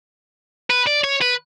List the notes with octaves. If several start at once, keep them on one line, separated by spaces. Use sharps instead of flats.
B4
D5
C#5
B4